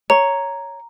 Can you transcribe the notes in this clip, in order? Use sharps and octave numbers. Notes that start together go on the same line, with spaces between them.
C#5 A#5